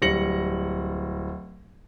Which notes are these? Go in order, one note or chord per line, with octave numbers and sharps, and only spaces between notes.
D1 G3 A#6 C#7 F#7